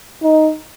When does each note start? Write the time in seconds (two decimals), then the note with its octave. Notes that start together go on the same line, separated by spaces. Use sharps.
0.23 D#4